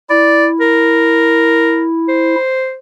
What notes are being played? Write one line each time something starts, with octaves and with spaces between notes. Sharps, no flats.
E4 D5
A#4
C5